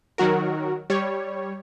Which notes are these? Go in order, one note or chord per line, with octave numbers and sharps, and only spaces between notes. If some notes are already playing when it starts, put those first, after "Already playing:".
D#3 F#3 F#4 A#4
G3 C#5